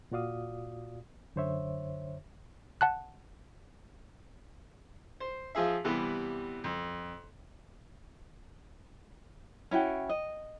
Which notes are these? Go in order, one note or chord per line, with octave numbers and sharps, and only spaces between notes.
A#2 F4 F#4 D5 F5 D#6
F#2 D3 C5 C#5 E5
F#5 A5 F#6
C5
F3 F4 G#4 E5
C3 E3 G3 B3
F2
C#4 E4 F#4 G5
D#5